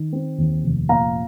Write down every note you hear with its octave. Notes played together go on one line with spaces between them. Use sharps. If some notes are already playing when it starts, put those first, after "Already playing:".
Already playing: D#3
C4
D#2
F1
A#2 F5 A#5